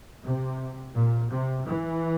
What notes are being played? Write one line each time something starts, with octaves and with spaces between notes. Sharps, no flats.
C3
A#2
C3
E3